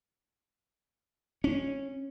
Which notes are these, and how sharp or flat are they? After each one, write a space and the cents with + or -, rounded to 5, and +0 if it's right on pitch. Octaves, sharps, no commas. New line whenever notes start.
C#4 -15